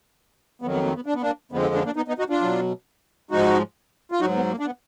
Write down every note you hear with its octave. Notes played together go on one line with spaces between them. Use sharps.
F2 D#3 F#3 B3
B3
A#3
B3
D4
B3
A#3 D4
F2 D3 F3 G#3 B3
B3
A#3 D4
A#3 D4
B3 D#4
B3 D#4
D#4 F#4
D4 F4
B2 F#3
G#2 F3 G#3 D#4 F#4
F4
G#2 F#3 D#4 F#4
B3
A#3
D4
B3